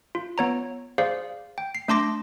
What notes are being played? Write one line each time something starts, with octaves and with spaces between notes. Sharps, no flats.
F4
B3 C#5 A#5
G#4 C5 D5 F5
G5
C7
A3 D4 A5 C6 D6 A#6